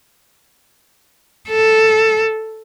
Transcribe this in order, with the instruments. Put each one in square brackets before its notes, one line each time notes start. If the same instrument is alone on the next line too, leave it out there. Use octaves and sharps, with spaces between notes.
[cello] A4